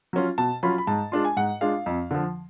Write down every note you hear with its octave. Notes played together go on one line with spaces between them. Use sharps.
F#3 C#4 F4
B2 A5
F#3 C#4 F4 B5
B5
G#2 A5
G#3 D4 F4
G#5
G#2 F#5
G#3 D4 F4 F5
F2
D3 F3